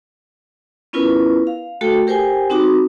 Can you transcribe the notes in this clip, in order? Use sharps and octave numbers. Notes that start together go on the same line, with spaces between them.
B3 C#4 E4 F4 A#4 B4
F5
A3 F#4 A4 G5
G4 A#4 C5 G5 G#5
C4 D#4 F#4 D6